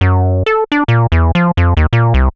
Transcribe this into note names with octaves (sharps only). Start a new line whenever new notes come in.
F#2
A4
D4
A#2
E2
F3
F2
D#2
A#2
C2